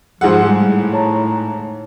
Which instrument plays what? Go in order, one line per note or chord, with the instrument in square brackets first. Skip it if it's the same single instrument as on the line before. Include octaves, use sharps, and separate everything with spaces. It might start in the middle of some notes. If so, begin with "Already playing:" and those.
[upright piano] G#2 G#4 F#5 [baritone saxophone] F3 [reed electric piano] E6
[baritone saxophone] A2 [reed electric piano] G3 G#3
[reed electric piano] C#5 A5 A#5